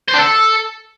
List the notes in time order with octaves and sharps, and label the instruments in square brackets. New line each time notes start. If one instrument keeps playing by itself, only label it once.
[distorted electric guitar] C5
D4
A4